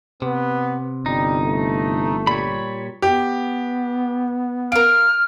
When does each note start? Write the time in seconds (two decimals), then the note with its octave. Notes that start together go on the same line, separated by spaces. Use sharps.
0.22 C3 B3
1.06 G1 G3 D#4
1.45 A3
2.27 A#2 G3 C#5 B5
3.02 B3 G4
4.72 A#4 F5 F6 D7